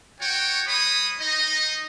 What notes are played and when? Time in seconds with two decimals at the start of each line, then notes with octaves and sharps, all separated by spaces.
0.21 F#4 C#5 G5
0.68 G#3 C#5 B5 D#6
1.21 D#4 D#5